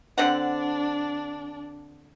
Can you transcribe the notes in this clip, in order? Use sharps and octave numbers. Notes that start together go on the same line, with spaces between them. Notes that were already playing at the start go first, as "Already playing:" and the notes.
D3 C4 D4 F#5